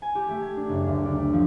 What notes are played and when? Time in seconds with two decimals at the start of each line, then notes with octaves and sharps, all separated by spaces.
0.02 G#5
0.15 G4
0.29 A3
0.42 G#6
0.57 D4
0.69 F#1
0.87 D2
1.05 D4
1.18 A3
1.33 F3